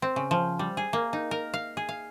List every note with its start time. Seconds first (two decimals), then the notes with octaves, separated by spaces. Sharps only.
0.02 C4
0.16 C#3
0.31 F3
0.59 G3
0.77 G#4
0.93 A#3
1.13 D#4
1.31 A#4
1.54 F5
1.77 G#4
1.89 F5